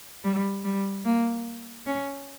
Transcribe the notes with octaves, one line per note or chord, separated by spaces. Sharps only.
G3
G3
A#3
C#4